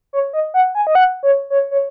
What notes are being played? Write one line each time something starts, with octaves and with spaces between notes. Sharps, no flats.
C#5
D#5
F#5
G#5
D#5
F#5
C#5
C#5
C#5